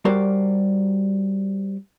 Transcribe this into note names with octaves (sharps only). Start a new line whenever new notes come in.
G3 F#4 A#4 C5 D5